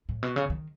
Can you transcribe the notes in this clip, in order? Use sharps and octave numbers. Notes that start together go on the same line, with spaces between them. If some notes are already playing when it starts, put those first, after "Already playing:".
A2
B2
C#3
D#3